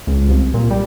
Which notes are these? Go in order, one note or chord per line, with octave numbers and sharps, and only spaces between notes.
C#2
C2
A#2
G3